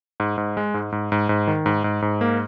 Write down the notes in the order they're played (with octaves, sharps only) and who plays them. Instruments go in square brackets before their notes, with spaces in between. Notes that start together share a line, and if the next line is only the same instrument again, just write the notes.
[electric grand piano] G#2
G#2
G#3
G#2
G#2
G#2
G#2
D#3
G#2
G#2
G#2
A#3